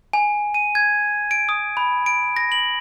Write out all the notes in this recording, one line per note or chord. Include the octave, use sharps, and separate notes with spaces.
G#5
D#7
G#6
D7
D#6
B5
D7
A#6
F#7